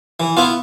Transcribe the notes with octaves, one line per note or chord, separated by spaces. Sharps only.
E3
B3 E4 F4